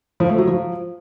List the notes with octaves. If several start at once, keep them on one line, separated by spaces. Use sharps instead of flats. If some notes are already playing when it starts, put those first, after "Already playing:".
F3
A3
F#3
F3